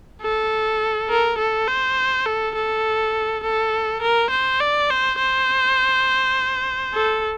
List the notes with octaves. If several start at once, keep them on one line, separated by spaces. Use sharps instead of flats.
A4
A#4
A4
C5
A4
A4
A4
A#4
C5
D5
C5
C5
A4